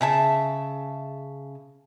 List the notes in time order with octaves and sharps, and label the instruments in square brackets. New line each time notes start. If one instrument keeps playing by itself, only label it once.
[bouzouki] C#3 E5 A5